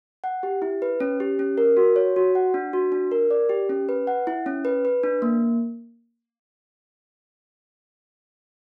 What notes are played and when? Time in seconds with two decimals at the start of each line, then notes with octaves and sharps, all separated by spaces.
0.24 F#5
0.43 G4
0.62 E4
0.82 B4
1.00 C#4
1.20 G4
1.39 C#4
1.58 A#4
1.77 F#4
1.96 C#5
2.16 F#4
2.35 F#5
2.54 D4
2.73 F#4
2.92 D4
3.12 A#4
3.31 D5
3.49 G4
3.69 C#4
3.89 B4
4.07 F#5
4.27 E4
4.46 C#4
4.65 B4
4.85 B4
5.03 D4
5.22 A#3